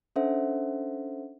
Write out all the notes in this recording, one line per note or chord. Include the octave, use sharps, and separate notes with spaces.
C#4 D4 A4 C5 E5 F#5